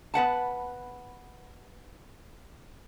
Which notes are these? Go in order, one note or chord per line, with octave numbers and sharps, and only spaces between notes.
B3 B4 F#5 A5